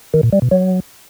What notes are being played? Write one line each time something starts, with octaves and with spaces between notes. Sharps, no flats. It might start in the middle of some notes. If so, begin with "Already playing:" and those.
D#3
A#2
G3
B2
F#3